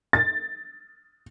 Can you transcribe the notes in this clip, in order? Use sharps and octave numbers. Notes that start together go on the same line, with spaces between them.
A6